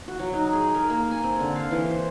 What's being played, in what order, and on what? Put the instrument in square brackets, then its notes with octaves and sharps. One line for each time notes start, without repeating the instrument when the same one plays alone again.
[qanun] F#4
F#3
D#4
G#4
A#4
A#3
G#5
C4
D3
F5
E3
C5